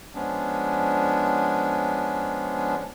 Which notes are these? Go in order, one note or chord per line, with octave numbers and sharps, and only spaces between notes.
F3 G#3 B3 C#4 D4